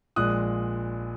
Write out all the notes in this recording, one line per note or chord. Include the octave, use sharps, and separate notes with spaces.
A#1 A#2 G#3 D#6 F#6